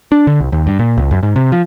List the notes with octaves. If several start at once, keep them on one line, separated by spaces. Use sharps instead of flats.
D4
D3
C2
D#2
G2
A#2
C#2
F#2
G#2
C3
F3